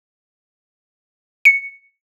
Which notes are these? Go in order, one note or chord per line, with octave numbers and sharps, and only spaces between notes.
C#7